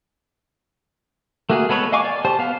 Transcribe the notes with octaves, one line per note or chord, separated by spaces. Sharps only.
A3 A#3 F#4 G#4
G#3 B3 A4 B4 C#5
D#5 F5 G#5 C#6 D6
D5
G4 C5 A5
B3 F5